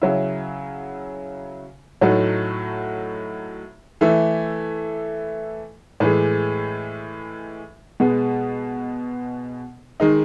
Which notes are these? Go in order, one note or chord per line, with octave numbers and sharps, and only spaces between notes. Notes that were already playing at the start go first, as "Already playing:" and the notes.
C#3 F#3 C#4 E4
A2 F#3 A3 D#4 F#4
E3 A3 E4
A2 E3 G#3
B2 G#3 B3
D#3 G#3 D#4